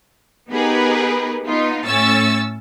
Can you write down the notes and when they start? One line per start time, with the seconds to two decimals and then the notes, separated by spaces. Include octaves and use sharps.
0.51 B3 D#4 G4 G#4 A#4 B4
1.47 B3 D#4 F4
1.86 A2 C#4 C#6 E6 A6